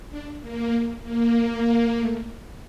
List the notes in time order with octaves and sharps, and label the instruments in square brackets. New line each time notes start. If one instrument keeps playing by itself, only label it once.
[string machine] D4
A#3
A#3
A#3
A3